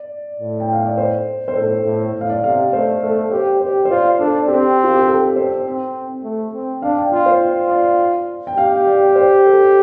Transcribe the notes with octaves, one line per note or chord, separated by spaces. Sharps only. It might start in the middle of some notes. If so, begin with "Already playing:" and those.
Already playing: D5
A2
G5
F5
D5
C5
C5
A2 A4
A2
A2
F5
D5
C3 F5
A3 C5
A3 A4
G4 C5
G4 C5
C5
F4 D5
D4 A4
C4 G4
F4
G4
A4
C5
C4
A3
C4
D4 F5
G5
F4 D5
C5
F4
D5
G5
G4 F5
D5
D5
C5
A4